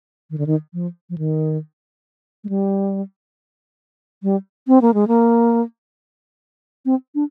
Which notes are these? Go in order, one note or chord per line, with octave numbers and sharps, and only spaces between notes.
D#3
D3
D#3
F3
F3
D#3
G#3
G3
G3
C4
A#3
G#3
A#3
C4
D4